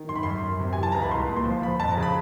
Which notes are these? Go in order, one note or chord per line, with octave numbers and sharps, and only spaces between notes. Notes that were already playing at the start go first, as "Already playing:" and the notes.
Already playing: D#3
F#2 C6
B5
F#2 C6
F#2
C3
E3 G#5
A5
C#2 A#5
B5
C2 C6
A#2
C6
F3
F3 B5
F2 A5
A#5
C#3
B5